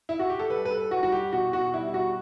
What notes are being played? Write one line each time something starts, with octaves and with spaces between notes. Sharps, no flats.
E4
F#4
G4
A4
G3 B4
B4
A4
G3 F#4
F#4
G4
B2 F#4
F#4
G3 E4
F#4